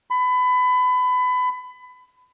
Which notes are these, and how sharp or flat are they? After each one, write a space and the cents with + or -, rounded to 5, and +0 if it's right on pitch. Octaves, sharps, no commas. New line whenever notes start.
B5 +25